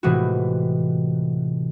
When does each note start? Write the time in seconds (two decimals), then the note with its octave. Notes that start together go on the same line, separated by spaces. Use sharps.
0.03 A2 C3 E3 G#3 F4 F#4